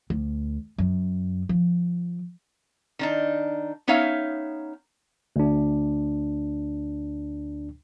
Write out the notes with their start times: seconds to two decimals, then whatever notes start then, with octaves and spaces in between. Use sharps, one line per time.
0.10 D2
0.78 F#2
1.49 F3
2.99 D#3 D4 D#4
3.88 B3 C#4 D#4 C#5 E5 F5
5.36 D2 D4